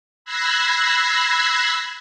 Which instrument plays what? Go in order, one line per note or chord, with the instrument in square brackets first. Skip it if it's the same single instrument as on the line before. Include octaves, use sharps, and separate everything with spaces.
[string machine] B5 E6 F#6 G#6 A#6 C7